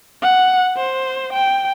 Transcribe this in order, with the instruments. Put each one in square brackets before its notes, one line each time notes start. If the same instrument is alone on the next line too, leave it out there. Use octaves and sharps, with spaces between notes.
[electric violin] F#5
C5
G5